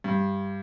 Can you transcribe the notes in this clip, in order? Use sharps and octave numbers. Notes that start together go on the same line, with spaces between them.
G2